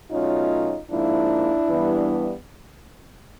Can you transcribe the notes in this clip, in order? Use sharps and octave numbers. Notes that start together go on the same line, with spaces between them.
B2 F#3 A3 C#4 D#4 F4
G#2 F3 A#3 D4 E4
G2 E3 G3 B3